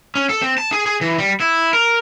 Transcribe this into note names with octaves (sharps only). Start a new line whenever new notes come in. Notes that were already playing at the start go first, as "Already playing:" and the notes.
C#4
A4
C4
A5
G#4
G#4
E3
G3
E4
A#4